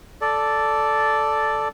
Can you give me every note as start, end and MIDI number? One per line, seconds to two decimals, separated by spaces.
0.21 1.68 69
0.21 1.68 74